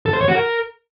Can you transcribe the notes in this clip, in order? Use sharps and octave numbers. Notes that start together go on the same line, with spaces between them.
A4
C5
C#5
F#4
A#4